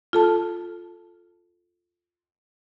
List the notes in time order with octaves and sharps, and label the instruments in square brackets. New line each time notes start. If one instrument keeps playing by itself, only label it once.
[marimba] F4 A4 A5